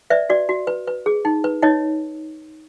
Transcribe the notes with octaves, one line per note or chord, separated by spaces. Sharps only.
B4 D5 E5
F#4 D5
F#4
B4
B4
G#4
D#4
B4
D#4 C#5 D#5